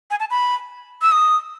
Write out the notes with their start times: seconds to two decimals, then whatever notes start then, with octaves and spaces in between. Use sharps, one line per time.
0.11 G#5
0.20 A5
0.31 B5
1.02 E6
1.12 D#6